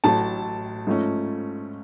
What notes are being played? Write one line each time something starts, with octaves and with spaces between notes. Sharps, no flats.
A1 A2 F#3 A5
G#2 F3 A3 C#4